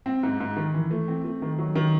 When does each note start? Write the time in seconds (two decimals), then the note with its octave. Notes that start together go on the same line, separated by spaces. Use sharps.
0.06 C4
0.23 G#2
0.40 G#2
0.56 D#3
0.74 E3
0.91 A3
1.08 C4
1.25 A3
1.42 D#3
1.59 F#3
1.76 D#3